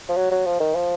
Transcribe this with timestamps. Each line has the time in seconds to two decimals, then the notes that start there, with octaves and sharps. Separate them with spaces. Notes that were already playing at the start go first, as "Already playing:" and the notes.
0.08 F3
0.16 F#3
0.31 F#3
0.46 F3
0.60 D#3
0.75 F3